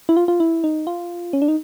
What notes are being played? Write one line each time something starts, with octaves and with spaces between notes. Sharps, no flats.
E4
F4
F4
E4
D#4
F4
C#4
D4
D#4